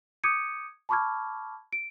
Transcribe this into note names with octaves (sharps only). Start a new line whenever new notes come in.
D6 D#6 G6 G#6 C#7 D#7
A5 B5 C#6 D6 F6 G#6
D7